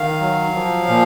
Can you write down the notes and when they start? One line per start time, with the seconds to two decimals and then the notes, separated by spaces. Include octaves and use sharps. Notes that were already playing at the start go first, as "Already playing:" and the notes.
Already playing: D#3 F5
0.20 F#3
0.54 F3
0.88 A#2